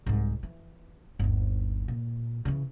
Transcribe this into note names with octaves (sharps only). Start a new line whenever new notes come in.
C2 G#2
E3
G1 D#2
A#2
C#3 E3